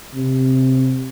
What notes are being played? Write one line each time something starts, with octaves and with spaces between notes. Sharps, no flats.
C3